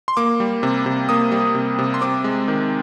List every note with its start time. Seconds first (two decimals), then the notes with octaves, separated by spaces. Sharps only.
0.08 C6
0.17 A#3 D6
0.40 G3
0.63 C3
0.86 C3
1.09 A#3 D#6
1.32 G3
1.55 C3
1.79 C3
1.94 C6
2.01 C4 D6
2.24 G#3
2.48 D#3